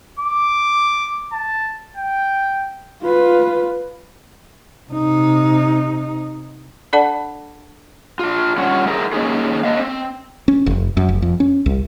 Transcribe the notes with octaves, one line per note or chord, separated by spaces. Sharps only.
D6
A5
G5
F4 B4
C3 D#4
D4 A4 D5 F#5 A5
D4 F4
G3 C#4 F4 C#5 F#5
E4 G#4 A#4
A#3 C#4 D#4 G#4
A#3 D4 D#5 F5
C4
C#4
F1
F#2
F1
F2
C#4
C2